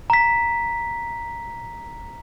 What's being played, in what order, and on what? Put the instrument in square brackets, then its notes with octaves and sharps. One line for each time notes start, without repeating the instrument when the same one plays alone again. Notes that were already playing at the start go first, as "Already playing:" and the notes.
[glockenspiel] A#5 B6